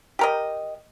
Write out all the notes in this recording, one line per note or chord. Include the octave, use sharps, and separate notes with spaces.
G4 A#4 D#5